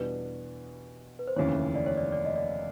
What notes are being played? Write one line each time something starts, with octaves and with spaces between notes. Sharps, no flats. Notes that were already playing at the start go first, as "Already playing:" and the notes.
Already playing: E2 B2 G3 B3 D4 B4
B4
C5
F1 D#2 C#3 E3 C#5
D5
C#5
D5
D5
D#5
D5